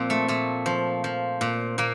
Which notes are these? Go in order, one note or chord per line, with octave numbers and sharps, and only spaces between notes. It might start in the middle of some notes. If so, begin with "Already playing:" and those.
Already playing: A#2 F3 C4
A3
A#2 A3
F3
F3
A#2
A#2 A#3